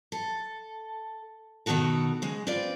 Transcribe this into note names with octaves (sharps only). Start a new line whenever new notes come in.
A4
B2 D#3 B3 D#4 F#4 A4
C#3 G#3
C4 F4 B4 D5